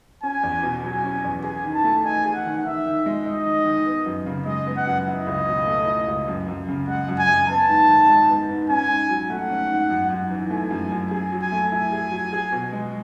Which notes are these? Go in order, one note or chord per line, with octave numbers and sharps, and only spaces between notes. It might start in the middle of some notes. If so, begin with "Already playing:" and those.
C#4 G#5
E2
B2
F#3 G#5
C#4
E2
G#4 G#5
D#3
A5
A3
D#4 G#5
G#4
F#5
D#3
D#3 E5
D#3
G#3
D#4 D#5
D#3
D#3
B3
F#2
C#3
G#3 D#5
B3
F#5
F#2
E4 D#5
C#2
B2
A3
E4
C#2
F#2
F#2
C#3
G#3 F#5
F#2
G#5
F#2
B3 A5
G#2
D#3
G#3
B3
G#2
C#4 G#5
G#2
F#3
A3 F#5
C#4
G#2
F#2
F#2
E3
A3 G#5
F#2
F#2
G#4 G#5
F#3
G#5
A3
E4 G#5
G#4
F#3
G#4
B2
G#3